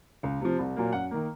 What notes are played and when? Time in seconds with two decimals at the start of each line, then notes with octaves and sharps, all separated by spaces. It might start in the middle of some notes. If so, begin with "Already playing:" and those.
0.23 C#2
0.41 C3 F3
0.59 C2
0.76 A#2 F#3 A#3
0.93 F#2 F#5
1.11 D#3 A#3